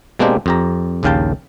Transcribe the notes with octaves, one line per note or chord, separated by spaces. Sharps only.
B2 G#3 A#3 C4 D4 G4
F2 G4 A#5
A#1 D#2 C#3 F5 G5 A5